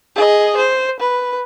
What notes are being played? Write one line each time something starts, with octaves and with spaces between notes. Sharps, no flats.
G#4 D#5
C5
B4